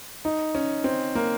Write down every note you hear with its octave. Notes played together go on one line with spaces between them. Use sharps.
D#4
C#4
C4
A#3